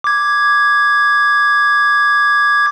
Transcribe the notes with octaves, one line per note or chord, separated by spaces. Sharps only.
D6 G#6